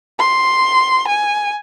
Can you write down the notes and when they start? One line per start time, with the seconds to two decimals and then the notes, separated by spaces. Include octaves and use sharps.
0.19 C6
1.08 G#5